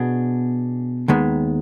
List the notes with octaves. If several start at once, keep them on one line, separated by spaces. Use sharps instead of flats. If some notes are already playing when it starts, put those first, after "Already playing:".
Already playing: B2 B3 D4 G#4
D#2 D#3 G#3 B3